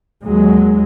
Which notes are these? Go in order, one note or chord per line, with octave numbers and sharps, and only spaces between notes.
D#2 F#3 G#3